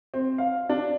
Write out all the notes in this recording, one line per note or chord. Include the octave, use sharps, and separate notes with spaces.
C4
F5
D4